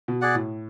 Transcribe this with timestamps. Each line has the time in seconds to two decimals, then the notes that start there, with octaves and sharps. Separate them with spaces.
0.08 B2
0.21 G#4 D5 F#5
0.35 A2